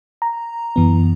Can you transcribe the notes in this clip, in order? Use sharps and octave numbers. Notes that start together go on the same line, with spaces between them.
A#5
F#2 E3 B3